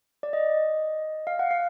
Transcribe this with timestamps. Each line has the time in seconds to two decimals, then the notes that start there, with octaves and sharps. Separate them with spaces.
0.23 D5
0.33 D#5
1.27 F5
1.39 F#5
1.51 F5